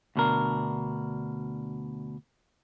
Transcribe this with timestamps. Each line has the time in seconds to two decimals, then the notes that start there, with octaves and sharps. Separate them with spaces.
0.16 D2 B2 D4 A#4